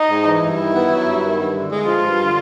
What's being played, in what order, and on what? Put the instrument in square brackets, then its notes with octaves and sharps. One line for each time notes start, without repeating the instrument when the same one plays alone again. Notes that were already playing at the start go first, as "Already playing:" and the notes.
Already playing: [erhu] D#4
[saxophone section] G#2
E3
[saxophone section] G2 [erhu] E4
[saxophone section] D#3
B3
F#3
G2
D#3
G2
D3
G#3
[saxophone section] F3 [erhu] F4
[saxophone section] G2
D3